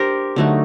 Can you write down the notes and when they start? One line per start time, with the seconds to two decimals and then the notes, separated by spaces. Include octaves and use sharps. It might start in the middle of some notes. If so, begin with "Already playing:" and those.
Already playing: D4 G4 A#4 C5
0.36 D3 F#3 A3 D#4